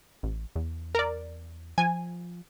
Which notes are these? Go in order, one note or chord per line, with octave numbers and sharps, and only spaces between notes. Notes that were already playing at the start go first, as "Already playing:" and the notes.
A1
E2
A#4 D5
F3 G#5